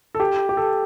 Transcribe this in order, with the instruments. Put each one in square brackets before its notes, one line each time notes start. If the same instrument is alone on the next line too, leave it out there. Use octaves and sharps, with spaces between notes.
[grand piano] A4
G4
G4
A4